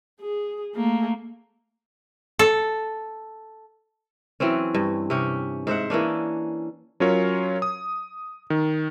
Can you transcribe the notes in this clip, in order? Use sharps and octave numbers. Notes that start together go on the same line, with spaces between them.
G#4
A3 A#3
A4
E3 F#3 C4 C#4
G2
C3 C#4 G4
G#2 C5 E5 F#5
E3 A#3 C#4 D4
F#3 C#4 F4 A#4 C#5
D#6
D#3